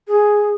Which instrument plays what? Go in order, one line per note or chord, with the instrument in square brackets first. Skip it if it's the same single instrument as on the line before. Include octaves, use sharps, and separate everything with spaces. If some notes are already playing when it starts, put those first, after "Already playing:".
[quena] G#4